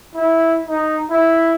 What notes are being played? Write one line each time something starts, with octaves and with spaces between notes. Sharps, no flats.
E4
D#4
E4